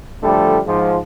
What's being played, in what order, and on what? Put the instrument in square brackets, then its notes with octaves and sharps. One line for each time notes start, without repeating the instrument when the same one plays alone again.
[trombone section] D3 F3 G3 A3
G#2 F3